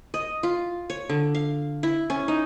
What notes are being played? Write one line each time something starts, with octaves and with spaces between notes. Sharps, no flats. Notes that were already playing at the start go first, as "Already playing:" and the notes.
D#5
F4
C#5
D3
F5
E4
C#4
D#4